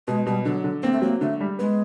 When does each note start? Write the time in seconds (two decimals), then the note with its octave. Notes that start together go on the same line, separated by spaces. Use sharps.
0.08 B2 G#3
0.26 B2 G3
0.45 D3 F#3
0.64 D3
0.83 A#3 C4
0.93 A3
1.02 F#3 A#3
1.21 D3 A3
1.41 G3
1.59 G#3 B3